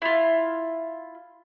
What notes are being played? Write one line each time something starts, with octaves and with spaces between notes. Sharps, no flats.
E4 F4